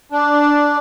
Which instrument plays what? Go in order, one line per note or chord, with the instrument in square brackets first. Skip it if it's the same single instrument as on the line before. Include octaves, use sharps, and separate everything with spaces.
[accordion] D4